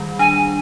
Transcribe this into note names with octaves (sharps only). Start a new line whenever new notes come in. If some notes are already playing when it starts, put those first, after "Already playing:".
Already playing: D#3 G3
D4 G#5